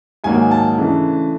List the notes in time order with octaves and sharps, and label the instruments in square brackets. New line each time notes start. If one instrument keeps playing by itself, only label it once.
[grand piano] G#2 D#3 F#3 A#3 D#4 G#5
A5
C#3 E3 A3 D4